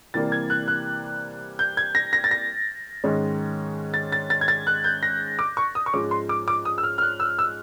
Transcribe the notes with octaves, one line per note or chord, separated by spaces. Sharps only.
C3 E3 G3 A#3 A6
G#6
F#6
F#6
G6
G#6
A#6
A#6
A6
A#6
G#2 D#3 G#3 C#4
A6
A6
A6
G#6
A6
F#6
G6
A#6
D6
C#6
D#6
C#6
G#2 F3 G#3 C#4 D6
C6
D6
D6
D#6
E6
F6
F6
F#6
E6
E6